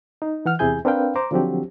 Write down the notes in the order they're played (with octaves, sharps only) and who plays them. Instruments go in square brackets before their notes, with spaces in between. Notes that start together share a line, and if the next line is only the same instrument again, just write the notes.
[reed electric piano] D#4
E3 F#5 F6
E2 C3 E4 G#4 G#5 G6
C4 D4 A#4 B4 F5 G5
C5 A#5 D6
D3 F3 F#3 C4 F#4 G4